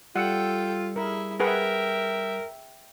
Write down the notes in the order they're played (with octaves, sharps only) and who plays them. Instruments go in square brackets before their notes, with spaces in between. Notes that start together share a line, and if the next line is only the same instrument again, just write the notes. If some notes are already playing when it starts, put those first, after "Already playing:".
[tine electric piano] G3 E6 C#7 [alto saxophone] F4 [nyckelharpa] A4 G5 [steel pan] F#5
[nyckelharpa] E4 G#4 [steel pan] A#4
[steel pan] G#4 B4 F#5 [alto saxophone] A#4 [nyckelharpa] E5 G5